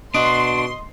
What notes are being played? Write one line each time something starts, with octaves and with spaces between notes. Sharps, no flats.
B2 D4 F#4 D#5 C6